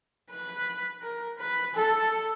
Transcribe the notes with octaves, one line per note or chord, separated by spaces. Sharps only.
B4
A#4
B4
A4